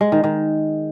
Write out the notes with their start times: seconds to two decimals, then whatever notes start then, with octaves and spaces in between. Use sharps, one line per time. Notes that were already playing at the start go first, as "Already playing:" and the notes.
0.01 G#3
0.12 D#3
0.24 D#3